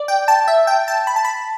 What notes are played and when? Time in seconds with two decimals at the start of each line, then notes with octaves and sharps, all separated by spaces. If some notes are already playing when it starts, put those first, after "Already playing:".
Already playing: D5
0.08 G5
0.28 A5
0.48 E5
0.67 G5
0.88 A5
1.07 B5
1.16 A5
1.25 B5